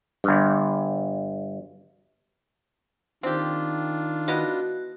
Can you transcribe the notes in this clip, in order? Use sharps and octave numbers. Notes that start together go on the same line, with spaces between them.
G1 G2
D#3 C4 D4 F4 G4
B3 E4 F#4 D#5